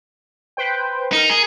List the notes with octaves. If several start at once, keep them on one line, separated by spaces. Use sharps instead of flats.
B4 C5 G5
D#4 A#4 C#7
G#4